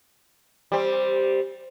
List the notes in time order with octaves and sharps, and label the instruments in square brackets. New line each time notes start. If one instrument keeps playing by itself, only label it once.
[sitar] G3 C4